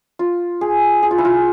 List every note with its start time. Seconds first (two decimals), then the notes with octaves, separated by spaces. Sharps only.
0.19 F4
0.61 G#4
1.03 G#4
1.11 F4
1.18 E4
1.25 F4